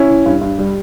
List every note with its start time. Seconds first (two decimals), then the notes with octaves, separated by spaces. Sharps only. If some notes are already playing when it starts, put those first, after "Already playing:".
Already playing: C#4 E4
0.09 E3
0.26 G2
0.41 G2
0.59 G3